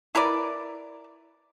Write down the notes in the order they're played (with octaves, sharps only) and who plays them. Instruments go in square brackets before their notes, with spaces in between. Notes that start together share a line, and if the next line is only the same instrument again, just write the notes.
[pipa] E4 A#4 B4 D5